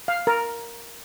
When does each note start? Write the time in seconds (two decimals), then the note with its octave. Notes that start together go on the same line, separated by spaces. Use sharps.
0.08 F5
0.27 A#4